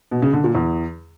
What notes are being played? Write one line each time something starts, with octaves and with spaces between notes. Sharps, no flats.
B2
C#3
D3
A#2
E2